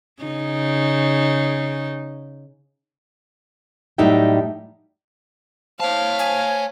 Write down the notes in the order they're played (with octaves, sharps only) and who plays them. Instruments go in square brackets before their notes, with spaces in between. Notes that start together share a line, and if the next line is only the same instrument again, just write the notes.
[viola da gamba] C#3 D#4
[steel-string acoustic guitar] A2 F#3 G3 D#4 E5 G5
[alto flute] C5 [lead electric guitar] C#5 A5 [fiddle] F5
[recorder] G#5